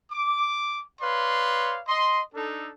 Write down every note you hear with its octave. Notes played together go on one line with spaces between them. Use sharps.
D6
B4 C#5 D5 F5 C6
D#5 C6
D4 D#4 A4